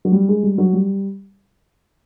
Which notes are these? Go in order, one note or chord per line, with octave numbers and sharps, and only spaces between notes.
F#3
G3
G#3
G3
F#3
G3